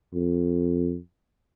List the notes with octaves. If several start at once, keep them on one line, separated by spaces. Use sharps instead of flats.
F2